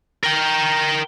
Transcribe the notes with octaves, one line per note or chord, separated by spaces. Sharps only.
A#4 G5